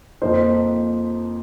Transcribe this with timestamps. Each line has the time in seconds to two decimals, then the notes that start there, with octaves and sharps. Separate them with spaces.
0.22 F2 F3 A#3 D#4 C5